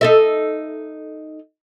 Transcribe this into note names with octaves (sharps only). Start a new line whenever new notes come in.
D#4 A4 E5